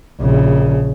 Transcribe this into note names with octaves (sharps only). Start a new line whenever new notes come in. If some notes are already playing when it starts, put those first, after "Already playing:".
A#1 C#3